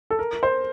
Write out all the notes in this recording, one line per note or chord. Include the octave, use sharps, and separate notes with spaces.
A4
A#4
C5